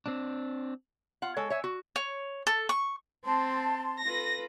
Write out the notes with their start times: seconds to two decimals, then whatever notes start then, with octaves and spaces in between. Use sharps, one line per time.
0.06 C4 D4
1.22 F4 F#5
1.37 G#3 A4 C#5
1.50 C#5 E5 G#5
1.64 F#4
1.96 C#5
2.47 A4
2.69 C#6
3.24 C4 A5 C6
4.03 F4 A4 B4 A#6